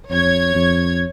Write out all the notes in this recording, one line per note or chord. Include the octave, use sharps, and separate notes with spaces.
F2 C#5 G#6
F2